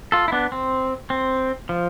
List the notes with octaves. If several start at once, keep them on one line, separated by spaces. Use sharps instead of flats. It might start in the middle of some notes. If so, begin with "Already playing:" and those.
F4 A4
E4
B3 D4
C4
C4
F3